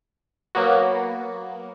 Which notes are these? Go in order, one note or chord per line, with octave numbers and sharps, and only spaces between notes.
F#3 A#3 B3 F#4